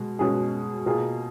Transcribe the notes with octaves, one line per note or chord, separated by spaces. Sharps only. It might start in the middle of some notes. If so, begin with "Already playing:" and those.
Already playing: B2 G#3
B2 G#3 C#4 G#4
B2 A#3 F4 G#4